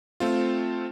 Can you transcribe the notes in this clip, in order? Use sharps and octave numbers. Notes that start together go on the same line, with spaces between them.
A3 C4 F4